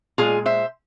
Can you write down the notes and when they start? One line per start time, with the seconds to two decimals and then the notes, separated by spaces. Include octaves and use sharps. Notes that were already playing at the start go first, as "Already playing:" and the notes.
0.18 A#2 G#3 F4 G#4
0.46 C5 E5